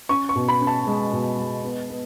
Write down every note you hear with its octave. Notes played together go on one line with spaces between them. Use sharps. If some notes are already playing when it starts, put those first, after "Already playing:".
C#4 C#6
C#6
B2
B5
C#4
A5
G#3
B2
G#3
B3
B3